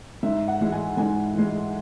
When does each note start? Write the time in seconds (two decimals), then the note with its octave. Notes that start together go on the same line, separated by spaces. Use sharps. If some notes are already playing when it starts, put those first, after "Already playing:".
0.23 G#2 E5
0.48 F#5
0.60 E3 G#3
0.72 G#5
0.97 G#2 G#5
1.35 E3 G#3